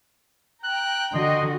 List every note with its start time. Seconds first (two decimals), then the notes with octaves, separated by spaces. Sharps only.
0.64 G5 A#5 F#6
1.14 D3 F#4 D#5 C6